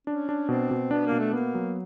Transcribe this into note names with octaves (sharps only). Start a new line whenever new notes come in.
C#4 D4
D4
B2 C4
B2
B3 D4
A#3
B2
A3
A#3 B3
F#3